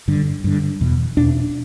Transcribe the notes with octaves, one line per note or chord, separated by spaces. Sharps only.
G2 D3
G2 D3
E2 B2
E2 B2 D4